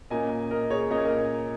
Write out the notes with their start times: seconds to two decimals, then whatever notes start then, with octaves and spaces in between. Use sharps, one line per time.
0.10 A#2 A#3 C#4 D#5 G#5
0.51 A#4 D#5
0.70 G#4 C#5
0.90 A#2 A#3 C#4 D#5
0.98 C#5
1.05 A#4 D#5